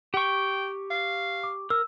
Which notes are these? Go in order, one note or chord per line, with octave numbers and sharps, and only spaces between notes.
G4 G5 C#6
F5
D6
A#4 E6